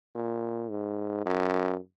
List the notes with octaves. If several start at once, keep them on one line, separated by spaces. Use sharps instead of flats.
A#2
G#2
F#2